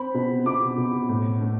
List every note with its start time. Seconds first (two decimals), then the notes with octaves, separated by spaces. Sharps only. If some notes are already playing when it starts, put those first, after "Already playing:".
Already playing: C4 B5
0.14 B2
0.46 B2 D6
0.77 B2
1.09 A2
1.41 A3